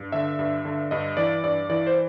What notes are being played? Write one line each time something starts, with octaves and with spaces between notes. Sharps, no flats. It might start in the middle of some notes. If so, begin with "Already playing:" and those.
Already playing: G2
D3 E5
G2
D3
G2 D#5
E3 D5
G2 D5
E3 D5
C5